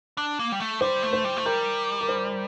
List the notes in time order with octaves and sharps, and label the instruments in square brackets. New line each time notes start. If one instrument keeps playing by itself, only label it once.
[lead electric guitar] D4
A#3
G3
A3
[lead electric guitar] G3 [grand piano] C5
[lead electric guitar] A3
[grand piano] C5
[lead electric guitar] G3
A3
[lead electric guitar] G3 [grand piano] A#4
[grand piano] A#4
C5